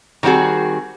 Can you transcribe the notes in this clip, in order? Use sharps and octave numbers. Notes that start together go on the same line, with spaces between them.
D#3 G3 C4 F#4 G#4